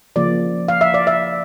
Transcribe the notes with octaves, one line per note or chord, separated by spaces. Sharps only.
C#3 F3 A#3 D5
F5
E5
D5
E5